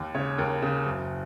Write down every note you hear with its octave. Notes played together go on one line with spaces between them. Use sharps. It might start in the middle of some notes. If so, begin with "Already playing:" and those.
Already playing: D#2
C#3 C#5
D#2 A#4
C#3
F#1